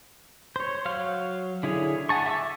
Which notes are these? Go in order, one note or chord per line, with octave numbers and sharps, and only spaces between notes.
C5 C#5
F#3 C#5 F5 F6
D3 E4 G#4 C#5
F#5 G#5 A5 C#6
E5 D6 E6